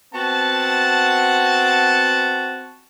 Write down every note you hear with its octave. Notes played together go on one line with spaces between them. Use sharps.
B3 C4 F#4 A5